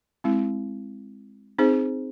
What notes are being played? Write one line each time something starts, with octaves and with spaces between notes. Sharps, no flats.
G#3 C4 E4
C4 D#4 G#4 C5